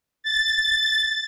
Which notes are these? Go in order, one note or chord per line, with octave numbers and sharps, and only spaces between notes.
A6